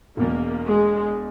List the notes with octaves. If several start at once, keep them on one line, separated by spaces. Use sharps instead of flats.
E1 E2 B2 A#3
G#3